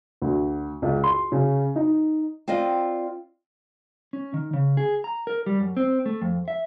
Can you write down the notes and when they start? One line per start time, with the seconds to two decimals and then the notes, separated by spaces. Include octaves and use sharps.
0.22 D2
0.82 C#2
1.04 C6
1.32 C#3
1.76 D#4
2.48 C4 F4 D5 D#5 G5
4.13 C#4
4.34 D#3
4.53 C#3
4.77 G#4
5.04 A#5
5.27 A#4
5.46 G3
5.60 F#2
5.77 C4
6.06 A3
6.22 F2
6.48 E5